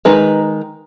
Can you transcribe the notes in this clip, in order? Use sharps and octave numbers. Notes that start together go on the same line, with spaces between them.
D#3 G#3 D#4 B4